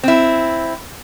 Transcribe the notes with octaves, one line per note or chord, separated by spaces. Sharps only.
C4 E4